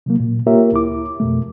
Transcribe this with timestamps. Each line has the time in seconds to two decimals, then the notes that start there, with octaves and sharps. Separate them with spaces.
0.06 C3 F#3 A#3
0.20 A#2
0.47 A#3 F4 G4 A#4 C#5 E5
0.72 D2 E4 D6
1.20 F2 B2 A3